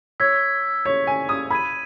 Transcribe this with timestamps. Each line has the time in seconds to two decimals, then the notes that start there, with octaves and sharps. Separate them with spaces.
0.20 C#5 E6 G#6 B6
0.85 C#5 E6 G#6 B6
1.07 G#5
1.29 D#6
1.50 B5 D#6 G#6 D#7